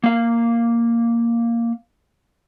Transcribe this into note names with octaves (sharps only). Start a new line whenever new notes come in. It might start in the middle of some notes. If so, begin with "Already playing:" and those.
A#3 F5